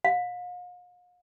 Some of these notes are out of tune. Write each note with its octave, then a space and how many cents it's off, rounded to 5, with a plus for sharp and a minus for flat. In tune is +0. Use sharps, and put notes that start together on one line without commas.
F5 +40